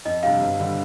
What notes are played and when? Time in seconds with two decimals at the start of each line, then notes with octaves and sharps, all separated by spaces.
0.05 F2 D#5
0.23 C3 G3 D4 G4 F5
0.41 G1
0.60 D3 G3